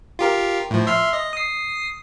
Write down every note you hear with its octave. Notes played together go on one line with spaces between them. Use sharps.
F4 G4 A#4
A2 F3
E5 C6 F6
D#5
D#6 C7